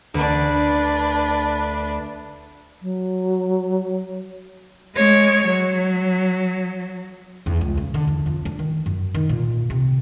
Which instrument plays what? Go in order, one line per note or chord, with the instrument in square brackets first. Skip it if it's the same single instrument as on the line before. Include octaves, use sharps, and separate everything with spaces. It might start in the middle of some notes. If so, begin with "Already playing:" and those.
[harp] D2 [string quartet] D4 B4
[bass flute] F#3
[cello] G#3 C#5
F#3
[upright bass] E2
C#2
C#3
D3
E2
F2
D4
D#3
F#2
D#3
A#2
C3